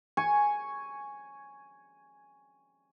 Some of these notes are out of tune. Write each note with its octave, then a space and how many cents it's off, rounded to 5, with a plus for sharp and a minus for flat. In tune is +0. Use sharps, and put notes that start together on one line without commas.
G#5 +0 C#6 +0